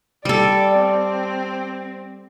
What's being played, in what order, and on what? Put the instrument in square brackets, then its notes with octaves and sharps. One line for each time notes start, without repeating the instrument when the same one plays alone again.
[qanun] G3 A4 [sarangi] D5
[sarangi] C4